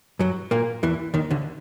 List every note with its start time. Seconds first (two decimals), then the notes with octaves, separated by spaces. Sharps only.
0.19 F#2 F#3
0.51 A#2 A#3
0.83 E2 E3
1.14 D#2 D#3
1.31 D2 D3